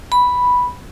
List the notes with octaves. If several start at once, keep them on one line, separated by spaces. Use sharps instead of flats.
B5